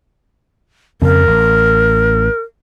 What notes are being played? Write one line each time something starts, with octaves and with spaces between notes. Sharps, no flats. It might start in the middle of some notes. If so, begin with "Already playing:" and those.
F2 C#3 C4 A#4
A1